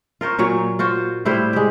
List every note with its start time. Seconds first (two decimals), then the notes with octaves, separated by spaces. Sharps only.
0.21 F4 A#4 C5 C#5
0.39 A#2 F#3 C#5
0.79 F4 F#4 C5
1.25 A2 G3 E4 C5
1.53 G#3 G4